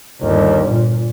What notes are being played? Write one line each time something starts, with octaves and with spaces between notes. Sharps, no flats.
G1 D#2
A#2